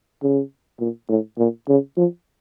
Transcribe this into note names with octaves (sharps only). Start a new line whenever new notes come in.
C#3
A#2
A2
A#2
C#3
F3